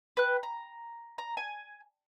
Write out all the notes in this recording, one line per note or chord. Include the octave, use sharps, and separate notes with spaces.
B4 G5 F#6
A#5
A#5
G#5